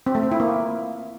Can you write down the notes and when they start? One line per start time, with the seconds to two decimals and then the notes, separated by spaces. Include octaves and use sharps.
0.06 C4
0.15 A3
0.23 C4
0.32 E4
0.40 A#3